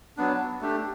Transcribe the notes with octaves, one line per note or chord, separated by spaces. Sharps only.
F#3 B3 D4
A3 D4 G4